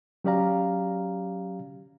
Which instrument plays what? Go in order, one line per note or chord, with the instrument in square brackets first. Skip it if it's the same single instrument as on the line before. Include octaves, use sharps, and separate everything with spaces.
[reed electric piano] F#3 C#4 G4 D5 F5 A#5